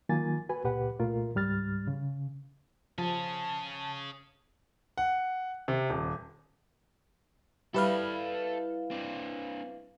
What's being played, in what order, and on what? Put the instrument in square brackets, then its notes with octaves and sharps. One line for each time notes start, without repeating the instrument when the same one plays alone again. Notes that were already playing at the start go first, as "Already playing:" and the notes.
[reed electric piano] D#3 F#3 A#3 F4 G#5 A6
F#4 B4 G#5
C#2 A#2 G4 B4 F#5
C2 A#2 A3 F4 A#4
C#2 G#2 G3 F6 A6
C#3
[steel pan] F3 [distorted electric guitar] C#4 G#4 [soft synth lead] A5
[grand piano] F#5
C3
D#1
[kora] G3 [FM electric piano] E4 B4 F5 [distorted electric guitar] A4 G5
[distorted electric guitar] C4 D4